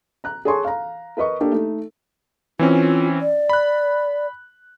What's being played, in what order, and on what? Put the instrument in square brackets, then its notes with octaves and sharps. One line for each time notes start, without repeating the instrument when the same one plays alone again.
[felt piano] A#5 F#6
G#4 C#5 G#5 A5 C6 C#6
F5 A#5
A#4 B4 D#5 C#6
A#3 D4 G4 A4
A3 D#4
[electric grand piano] E3 C4 C#4 [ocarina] F4
[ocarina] D5
[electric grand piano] B5 F#6